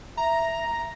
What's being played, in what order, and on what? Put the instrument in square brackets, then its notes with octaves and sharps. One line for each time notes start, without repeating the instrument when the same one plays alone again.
[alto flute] E5 [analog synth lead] A#5